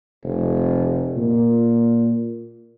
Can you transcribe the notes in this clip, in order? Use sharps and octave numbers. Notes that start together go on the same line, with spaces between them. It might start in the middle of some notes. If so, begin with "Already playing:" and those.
F1
A#2